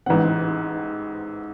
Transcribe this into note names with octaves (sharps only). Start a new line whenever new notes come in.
A1 G#2 E3 C4 F#5